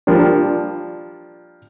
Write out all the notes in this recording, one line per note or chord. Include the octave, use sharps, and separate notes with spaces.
F3 G3 A#3 D4